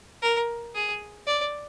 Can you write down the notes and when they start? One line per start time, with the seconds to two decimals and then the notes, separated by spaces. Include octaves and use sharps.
0.22 A#4
0.75 G#4
1.27 D5